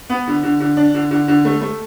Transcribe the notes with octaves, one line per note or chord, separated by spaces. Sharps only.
B3
D3
D3
D3
D4
D3
D3
D3
A3
A3